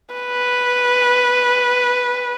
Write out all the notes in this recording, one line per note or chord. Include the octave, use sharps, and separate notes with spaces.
B4